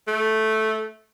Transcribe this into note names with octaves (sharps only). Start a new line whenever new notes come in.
A3